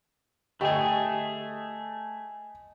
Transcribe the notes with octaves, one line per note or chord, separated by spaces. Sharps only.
D3 A3 G4 G#4 D#5 G5 G#5 C#6